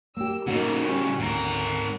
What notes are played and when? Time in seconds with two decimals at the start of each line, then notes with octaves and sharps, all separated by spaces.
0.17 A#3 G4 E6
0.47 A2 C#3 A#3 D#4 F#4
0.84 C#4 G4
1.19 D2 G#2 A#4 F#5